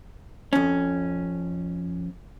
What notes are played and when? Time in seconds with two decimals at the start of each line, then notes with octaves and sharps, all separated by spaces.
0.53 F2 C#4